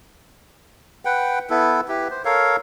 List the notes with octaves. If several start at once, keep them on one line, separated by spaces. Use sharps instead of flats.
B4 F#5 G5
B3 E4 A4 B4
E4 G4 B4
C5
A4 A#4 C#5 F5